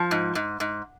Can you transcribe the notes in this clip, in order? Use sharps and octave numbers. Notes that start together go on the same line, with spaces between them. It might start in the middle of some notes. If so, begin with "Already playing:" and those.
Already playing: F3
G#2
G#2
G#2